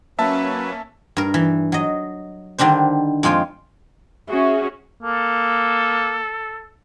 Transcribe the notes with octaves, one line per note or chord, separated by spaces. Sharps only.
F#3 A#3 C#4 B4 E5 A5
G2 A#4
E3
F#3 D#5
D3 D#3 G3 D4 C5
F2 G#3 F4 C#5 G5
C#4 E4 F#4 G#4 E5
A#3 A4